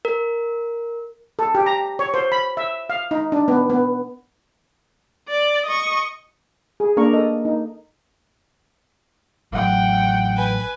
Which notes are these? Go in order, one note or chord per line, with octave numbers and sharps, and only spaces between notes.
A#4
A4
G4
A#5
C#5
C5
B5
E5
F5
D#4
D4
B3
B3
D5
D#5 C#6
G#4
A#3 D4 A#4 C#6
A4 D#5
D#4
A1 F#3 F#5 G5
B4 G#5